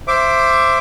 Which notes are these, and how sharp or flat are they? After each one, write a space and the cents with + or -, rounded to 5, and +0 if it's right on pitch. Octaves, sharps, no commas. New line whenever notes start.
C5 +0 E5 +20 D6 +0